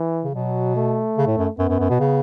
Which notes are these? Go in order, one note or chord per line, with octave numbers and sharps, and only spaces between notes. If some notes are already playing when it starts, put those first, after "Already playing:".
Already playing: E3
C#3
B2 F#3
A3
C#3
A2
F#2
F#2 B3
F#2
F#2
B2
C#3